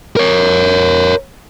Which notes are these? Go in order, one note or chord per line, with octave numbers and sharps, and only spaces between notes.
A#4 C#5